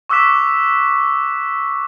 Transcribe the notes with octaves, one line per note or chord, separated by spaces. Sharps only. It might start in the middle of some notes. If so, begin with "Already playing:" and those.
C#6 D6 E6 F#6 B6 E7